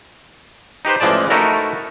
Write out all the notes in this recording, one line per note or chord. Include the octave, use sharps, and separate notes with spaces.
D#4 G4 B4 C5
A1 E3 F3 G#3 D5 A5
A3 D#4 E4 F#4 A4 A#4